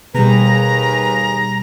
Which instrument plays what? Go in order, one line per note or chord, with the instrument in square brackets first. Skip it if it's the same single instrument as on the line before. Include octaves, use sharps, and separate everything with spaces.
[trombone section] D#2 G#4 [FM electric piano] B2 G3 [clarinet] B4 [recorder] A#5